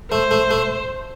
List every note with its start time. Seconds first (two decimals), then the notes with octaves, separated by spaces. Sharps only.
0.11 A3 C5
0.31 A3
0.51 A3